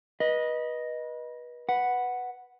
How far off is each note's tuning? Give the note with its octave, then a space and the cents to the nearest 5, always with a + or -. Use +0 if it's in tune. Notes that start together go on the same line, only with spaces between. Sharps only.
B4 -30 D#5 +0
B4 +0 F#5 +0